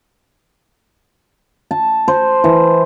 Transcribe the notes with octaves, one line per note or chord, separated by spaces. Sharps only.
A5
C5
E3